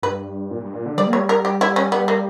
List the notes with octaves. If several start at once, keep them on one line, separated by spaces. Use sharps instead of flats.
G2 B4
A#2
G2
A#2
D3
G3 D5
A#3
G3 C#5
A#4
G4
E4
C#4
B3
A#3